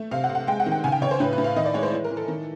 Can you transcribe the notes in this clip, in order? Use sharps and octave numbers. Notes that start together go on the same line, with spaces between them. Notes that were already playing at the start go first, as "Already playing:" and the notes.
Already playing: A3
C3 F5
F#5
C3
F#5
G#3 G5
F#5
D#3
G5
C#3 G#5
G5
C#3 C#5
C5
A2 B4
B4
A2
F5
D#3 D#5
D5
G#3 C#5
C5
E3
A#4
E3
A4
D#3